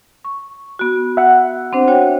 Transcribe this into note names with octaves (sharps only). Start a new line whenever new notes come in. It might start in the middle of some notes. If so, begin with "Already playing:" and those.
C#6
B3 F#4
E5 F#5
C4 D4 C5
F#4 C#5 G5